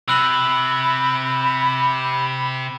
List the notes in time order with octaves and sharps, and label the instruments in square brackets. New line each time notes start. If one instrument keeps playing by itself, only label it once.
[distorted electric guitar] C3 [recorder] B5 [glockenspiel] E6 F#6 F#7